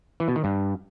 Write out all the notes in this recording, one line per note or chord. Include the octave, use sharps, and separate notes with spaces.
E3
B2
D#3
G2